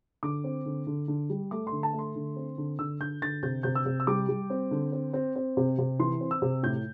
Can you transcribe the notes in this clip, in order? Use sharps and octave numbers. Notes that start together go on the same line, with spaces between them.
D3 D6
C4
D3
D3
D3
G3
A3 D6
C6
D3
A5
A3
C6
D3
C4
D3
D3 E6
D3 G6
D3 A6
C3 G6
C3 G6
E6
C3
E6
G3 D6
G3
C4
D3
C4
C4
C4
C3
C3
E3 C6
C4
E6
C3
A2 G6